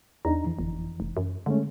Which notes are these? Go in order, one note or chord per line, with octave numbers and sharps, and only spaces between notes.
E2 D4 D#4 A#5
F2 E3
G1
F1
F#2
D3 G#3 A3 C#4